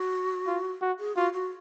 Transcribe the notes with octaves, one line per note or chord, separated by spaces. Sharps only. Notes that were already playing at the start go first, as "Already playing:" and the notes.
Already playing: F#4
F4
F#4
G#4
F4 F#4
F#4